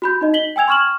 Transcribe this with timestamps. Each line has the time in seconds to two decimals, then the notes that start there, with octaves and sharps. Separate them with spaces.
0.02 F#4 B5 G6
0.21 D#4 D#5
0.34 B6 F#7 G7
0.56 G5 G#5 E6 G#6 F7
0.68 C6 C#6 F6 E7 F#7